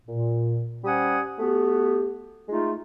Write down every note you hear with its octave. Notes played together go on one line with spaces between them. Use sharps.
A#2
G3 C#4 C5 F#5 G#5 D#6
A3 B3 F#4 G4
G#3 A3 D#4 F4